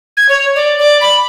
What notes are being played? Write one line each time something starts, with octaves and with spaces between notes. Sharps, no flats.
G#6
C#5
D5
D5
B5